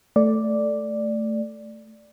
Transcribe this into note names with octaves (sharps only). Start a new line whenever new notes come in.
A3 D5